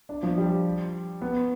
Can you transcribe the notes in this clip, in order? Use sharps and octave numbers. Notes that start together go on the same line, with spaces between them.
D4
F3
G3
B3